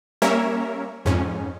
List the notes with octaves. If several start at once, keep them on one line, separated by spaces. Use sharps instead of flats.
G3 A#3 C#4 A#4 C#5 E5
F2 G#2 C#4